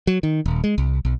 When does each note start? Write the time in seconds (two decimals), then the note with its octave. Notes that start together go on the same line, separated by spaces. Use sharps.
0.07 F#3
0.23 D#3
0.46 D#1
0.64 G#3
0.78 C2
1.05 B1